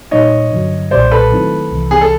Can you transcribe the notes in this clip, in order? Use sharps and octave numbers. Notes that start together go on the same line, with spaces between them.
A#2 G3 A#3 D#4 C#5 D#5
G2 D3 F#3
B1 A#2 G3 C5 D5
A4 B4
D#3 F#3 A3 C4 E4
C2 C3 E3
G#4
A4